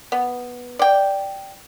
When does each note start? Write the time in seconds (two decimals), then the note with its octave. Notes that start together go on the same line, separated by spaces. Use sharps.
0.12 B3
0.79 D5 G5